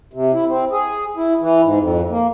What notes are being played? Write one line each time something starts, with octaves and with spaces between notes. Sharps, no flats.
C3
E4
C4
G#4
E4
E3
G#2
F2
A#3